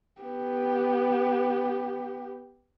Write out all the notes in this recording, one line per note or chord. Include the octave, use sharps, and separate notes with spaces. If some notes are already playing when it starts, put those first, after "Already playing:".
B3 G4